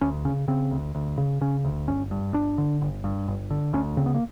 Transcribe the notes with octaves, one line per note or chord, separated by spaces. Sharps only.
D2 C#4
C#3 C#4
C#3 C4
D2
D2
C#3
C#3 C#4
D2
G1 C#4
G2
G1 D4
D3
G1
G2
G1
D3
D2 C#4
C#3 C4
B3
A#3